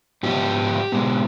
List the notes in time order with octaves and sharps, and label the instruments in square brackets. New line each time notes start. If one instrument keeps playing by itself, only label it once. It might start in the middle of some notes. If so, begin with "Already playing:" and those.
[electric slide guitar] G#2 F3 B3 G4
B2 G#3 B3